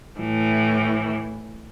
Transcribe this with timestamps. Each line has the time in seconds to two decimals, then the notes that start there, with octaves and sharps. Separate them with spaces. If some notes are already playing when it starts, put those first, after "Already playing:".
0.20 A2 E3